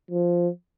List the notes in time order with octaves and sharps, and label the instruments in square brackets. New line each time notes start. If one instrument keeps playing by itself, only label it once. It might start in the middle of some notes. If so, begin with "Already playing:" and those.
[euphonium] F3